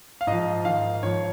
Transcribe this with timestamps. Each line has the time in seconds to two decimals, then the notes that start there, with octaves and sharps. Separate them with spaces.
0.21 F5
0.27 G#2 F3 D#5
0.65 G#2 D#3 F5
1.03 G#2 F3 C#5